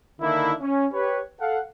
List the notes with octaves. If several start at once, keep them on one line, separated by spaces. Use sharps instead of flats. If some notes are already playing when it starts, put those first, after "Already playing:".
D3 D#3 A#3 D4 E4
C#4
G4 B4 C#5
A4 F5 F#5